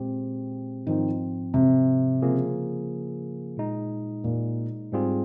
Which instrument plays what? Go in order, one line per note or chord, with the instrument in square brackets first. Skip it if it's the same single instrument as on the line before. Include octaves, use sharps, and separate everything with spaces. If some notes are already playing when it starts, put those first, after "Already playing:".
Already playing: [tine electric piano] A#2 G#3 C4 G4
[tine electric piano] G#2 F3 C4 [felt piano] D#3
[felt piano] C3
[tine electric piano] C#3 F3 A#3 F4 G#4
A#2 G#3 D#4
[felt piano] A#2
[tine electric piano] G#2 G3 C4 F4 G#4